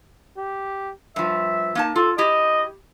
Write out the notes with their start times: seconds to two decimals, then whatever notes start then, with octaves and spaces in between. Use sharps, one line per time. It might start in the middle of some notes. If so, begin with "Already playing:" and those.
0.37 G4
1.16 G2 F3 E5
1.75 A#3 D#4 A5
1.96 F4 A4
2.18 E4 G4 D#5